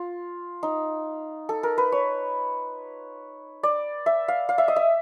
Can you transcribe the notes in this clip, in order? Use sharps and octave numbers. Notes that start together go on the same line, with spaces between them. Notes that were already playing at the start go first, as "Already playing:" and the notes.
Already playing: F4
D#4
A4
A#4
B4
C#5
D5
E5
F5
F5
E5
D#5
E5